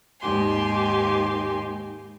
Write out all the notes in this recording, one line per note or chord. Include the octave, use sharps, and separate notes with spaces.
D#2 G#2 G#3 G4 G#5 C6